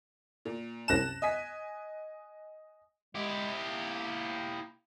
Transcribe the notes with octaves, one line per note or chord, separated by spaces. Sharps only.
A#2
C2 F#2 A5 F#6 A#6 E7
D#5 G#5 B6
G#3 E4 G4
A#3